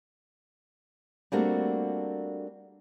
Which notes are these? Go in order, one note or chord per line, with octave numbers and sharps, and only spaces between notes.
G3 A3 A#3 C4 D4 F#4